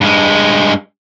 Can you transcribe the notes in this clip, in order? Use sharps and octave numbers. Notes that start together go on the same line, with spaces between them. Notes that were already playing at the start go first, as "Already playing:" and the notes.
G2 G#3